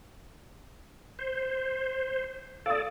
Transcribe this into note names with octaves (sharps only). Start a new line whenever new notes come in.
C5
A4 D5 F5 D#6